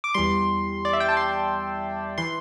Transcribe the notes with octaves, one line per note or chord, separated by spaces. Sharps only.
D6
E2 E3 G3 C6
D5
E5
G5
A5
C6
E3 C6